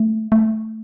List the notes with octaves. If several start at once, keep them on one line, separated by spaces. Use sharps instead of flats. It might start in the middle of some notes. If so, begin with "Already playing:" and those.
Already playing: A3
A3